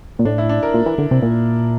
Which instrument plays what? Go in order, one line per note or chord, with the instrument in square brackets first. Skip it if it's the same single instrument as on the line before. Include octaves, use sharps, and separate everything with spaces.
[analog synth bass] A#2
[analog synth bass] A2 [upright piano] D4
[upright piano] E4
D4
A#4
[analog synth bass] A#2
E3
D3
C3
A#2